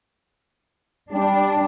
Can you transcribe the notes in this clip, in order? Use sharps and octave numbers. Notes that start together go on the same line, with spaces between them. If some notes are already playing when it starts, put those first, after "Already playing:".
G3 D4